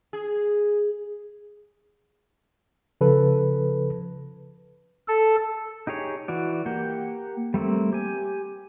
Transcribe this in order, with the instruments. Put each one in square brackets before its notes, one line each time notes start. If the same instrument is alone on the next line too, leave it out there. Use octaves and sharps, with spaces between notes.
[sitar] G#4
[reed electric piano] C#3 F3 A4 B4
[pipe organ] A4
[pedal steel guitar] D#4 G4 G#4 C#5
E3 F#4 D5
A#3 G4 F#5 G5
G3 A3 A#3 C4
G4 G#5